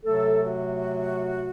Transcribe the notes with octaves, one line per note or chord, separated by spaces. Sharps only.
C3 F#3 A3 A4
F#4